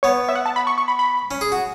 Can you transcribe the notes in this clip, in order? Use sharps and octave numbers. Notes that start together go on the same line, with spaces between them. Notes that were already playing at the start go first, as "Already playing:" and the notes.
B3 C#5
E5
F#5
A5
B5
C#6
C#6
B5
B5
C#4
G#4
F#4